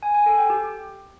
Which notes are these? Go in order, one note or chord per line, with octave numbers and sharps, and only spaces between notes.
G#5
G#5
A4
G5
G4